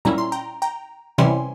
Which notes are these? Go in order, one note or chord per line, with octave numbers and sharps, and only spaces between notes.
A#2 G3 C#4 E4 A#5
C6
G5 A#5
G5 A#5
C3 E3 G3 C#4 E4 G#5 C6